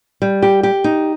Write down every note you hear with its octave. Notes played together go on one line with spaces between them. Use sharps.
G3
G4
G4
D#4